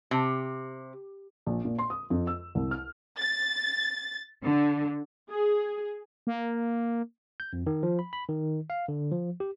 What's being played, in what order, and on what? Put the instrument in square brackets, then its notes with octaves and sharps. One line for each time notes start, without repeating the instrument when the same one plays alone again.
[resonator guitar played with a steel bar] C3
[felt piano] A#1
A#2
C6
D#6
F2
E6
C2
F6
[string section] A6
D3
[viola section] G#4
[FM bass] A#3
[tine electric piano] G6
F2
D#3
F3
B5
B5
D#3
F5
D3
F3
G4